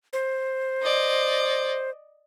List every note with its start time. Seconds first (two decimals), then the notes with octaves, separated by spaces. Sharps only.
0.13 C5
0.82 D5 D#5